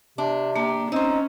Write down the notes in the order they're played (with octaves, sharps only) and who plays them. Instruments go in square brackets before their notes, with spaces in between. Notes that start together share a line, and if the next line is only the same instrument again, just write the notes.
[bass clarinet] C3 [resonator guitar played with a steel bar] D4
[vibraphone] A#3 [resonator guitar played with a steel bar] D4 [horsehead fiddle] G4
[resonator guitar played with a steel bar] C4 C5 [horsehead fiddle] C#4 [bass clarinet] D#4 [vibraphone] D#5